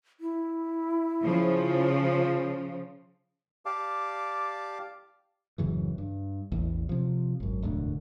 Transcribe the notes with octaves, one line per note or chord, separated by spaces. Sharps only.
E4
C#3 F3
G4 D5 F5 A5 D6
D1 F#2 C#3 E3
G2
A1 E2
C3 F3
G#1 F#2
E1 D2 A2 D3